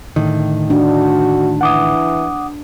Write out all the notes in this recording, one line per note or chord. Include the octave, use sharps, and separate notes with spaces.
A2 D3 D#3
D4 F#4
E3 F#5 D6 D#6